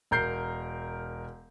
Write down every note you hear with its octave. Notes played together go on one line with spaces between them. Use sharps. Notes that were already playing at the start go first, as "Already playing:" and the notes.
E1 A#4 G6 C7